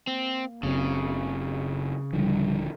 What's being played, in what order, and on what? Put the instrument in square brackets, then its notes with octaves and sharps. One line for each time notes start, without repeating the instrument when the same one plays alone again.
[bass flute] A#3 [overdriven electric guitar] C4
[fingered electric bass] F#1 F#3 C4 [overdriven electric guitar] C#3
[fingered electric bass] D#1 D3 F3 [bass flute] G3